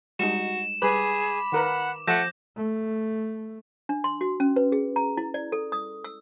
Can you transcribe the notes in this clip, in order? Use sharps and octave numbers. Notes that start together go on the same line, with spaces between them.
G3 G#3 D#4 F#4 E7
G3 G#4 B4 B5 D6
D#3 A#4 B4 F#5
F3 A3 F#5 G6 A#6 E7
A3
D4
C6
F#4
C#4
B4
G#4
A#5
E4
D5
A4
D#6
E6